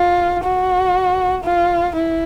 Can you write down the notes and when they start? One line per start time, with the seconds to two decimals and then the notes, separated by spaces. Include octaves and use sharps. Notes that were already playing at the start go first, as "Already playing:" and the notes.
Already playing: F4
0.43 F#4
1.44 F4
1.95 E4